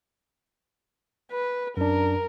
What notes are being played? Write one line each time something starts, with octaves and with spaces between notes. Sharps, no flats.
B4
F#2 D4 A#4